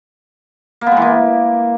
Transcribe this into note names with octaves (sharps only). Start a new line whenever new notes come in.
A#3
B3
G#3
E3
A#3